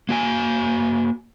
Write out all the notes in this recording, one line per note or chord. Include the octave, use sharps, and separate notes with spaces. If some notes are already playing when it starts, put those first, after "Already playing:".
A#3 F#4 G#5